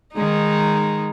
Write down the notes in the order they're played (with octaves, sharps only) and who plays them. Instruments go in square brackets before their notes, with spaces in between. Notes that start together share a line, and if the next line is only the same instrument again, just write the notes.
[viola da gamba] D#3 G#3 D#4